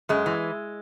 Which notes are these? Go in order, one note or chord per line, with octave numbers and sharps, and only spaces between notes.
F#2 G#3
E3